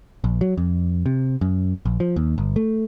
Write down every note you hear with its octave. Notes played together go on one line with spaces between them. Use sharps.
A#1
F#3
F2
C3
F#2
A#1
F3
D#2
G1
A3